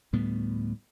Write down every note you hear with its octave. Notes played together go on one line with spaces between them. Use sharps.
D2 A2 G3 B3